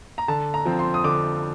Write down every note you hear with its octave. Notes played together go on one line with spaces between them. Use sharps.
A#5
D3 A5
A#5
F3 C4
C6
D#6
D3 D6